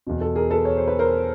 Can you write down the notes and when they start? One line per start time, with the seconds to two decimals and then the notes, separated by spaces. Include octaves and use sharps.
0.07 E2 B2
0.21 A4
0.36 G#4 A#4
0.51 A4 B4
0.65 C#5
0.77 C5
0.88 B4
0.99 A#4 C5